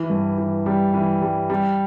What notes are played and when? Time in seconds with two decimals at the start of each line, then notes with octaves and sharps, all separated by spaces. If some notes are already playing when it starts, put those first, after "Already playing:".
Already playing: E3
0.10 G2
0.38 E3
0.66 G3
0.94 E3
1.22 G3
1.50 G3